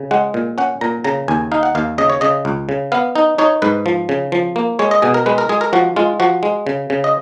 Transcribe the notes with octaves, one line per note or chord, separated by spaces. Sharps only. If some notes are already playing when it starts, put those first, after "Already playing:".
Already playing: C#3
G#3 F#5
A#2
C#4 F#5
A#2 A#5
C#3 A#5
D#2 G#5
D#4 F5
F#5
D#2 F5
C#3 D#5
C#5
C#3 D#5
C#2
C#3
B3 F5
D#4
D#4 C#5
G#2 B4
F3
C#3
F3
A#3
G#3 C#5
D#5
B2 G#4
A#4
G#3 B4
A#4
G#3 G#4
A#4
F3 F#4
G#3 F4
F3 F#4
G#3
C#3
C#3
D#5